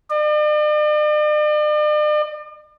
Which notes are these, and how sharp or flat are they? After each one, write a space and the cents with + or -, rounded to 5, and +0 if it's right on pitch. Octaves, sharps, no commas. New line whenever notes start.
D5 +45